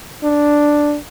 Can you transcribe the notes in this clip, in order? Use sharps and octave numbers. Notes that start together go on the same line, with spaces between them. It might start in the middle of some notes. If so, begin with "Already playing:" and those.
D4